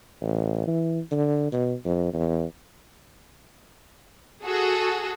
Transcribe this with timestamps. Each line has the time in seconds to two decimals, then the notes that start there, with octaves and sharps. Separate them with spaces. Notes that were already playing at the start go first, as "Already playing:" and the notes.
0.21 A1
0.67 E3
1.11 D3
1.52 B2
1.85 F2
2.13 E2
4.44 F#4 G#4 A4